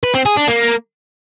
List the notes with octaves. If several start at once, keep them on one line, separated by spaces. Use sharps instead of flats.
B4
C4
G#4
D4
A#3